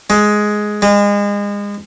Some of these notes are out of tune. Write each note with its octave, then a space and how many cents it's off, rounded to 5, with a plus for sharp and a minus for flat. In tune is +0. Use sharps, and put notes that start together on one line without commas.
G#3 +10
G#3 -30